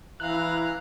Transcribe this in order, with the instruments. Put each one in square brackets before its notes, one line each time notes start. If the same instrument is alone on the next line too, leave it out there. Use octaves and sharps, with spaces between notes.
[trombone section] E3 E4 [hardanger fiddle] F5 A#5 [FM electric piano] F#6